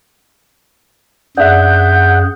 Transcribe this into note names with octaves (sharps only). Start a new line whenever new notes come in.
F#2 D4 G#4 E5 F#5 G6